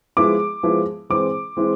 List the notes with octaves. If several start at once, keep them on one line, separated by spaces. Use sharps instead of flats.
F3 G#3 B3 E4 D6
F3 G#3 B3 E4
E3 G#3 C4 E4 D6
E3 G#3 C4 E4